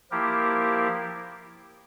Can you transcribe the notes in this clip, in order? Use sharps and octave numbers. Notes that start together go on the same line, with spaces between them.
F3 A#3 E4 G4 A#4